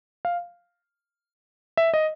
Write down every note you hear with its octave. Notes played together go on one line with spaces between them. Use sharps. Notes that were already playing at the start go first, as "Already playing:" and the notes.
F5
E5
D#5